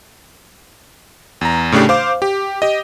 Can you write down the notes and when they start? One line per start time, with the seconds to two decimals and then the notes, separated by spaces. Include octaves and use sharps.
1.41 E2 A#5
1.72 A2 C#3 A3 D4 G4
1.89 C5 F5 D6
2.22 G4
2.62 G4 D#5